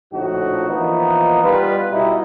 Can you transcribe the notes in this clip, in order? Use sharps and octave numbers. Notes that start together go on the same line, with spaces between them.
A#1 A2 D3 F3 D#4 F#4
E3 F3 A#3 B3 D#4
G3 B3 F4 B4
B2 G3 D#4 E4